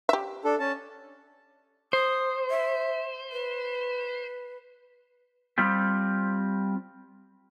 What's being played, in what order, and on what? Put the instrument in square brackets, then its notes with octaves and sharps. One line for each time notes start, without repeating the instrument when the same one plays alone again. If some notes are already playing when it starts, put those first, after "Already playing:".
[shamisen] G4 E5
[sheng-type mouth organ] D4 A4
C#4 A5
[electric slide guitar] C5 [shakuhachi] D#6
[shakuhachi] E5
B4
[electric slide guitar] G3 C4 F4 G4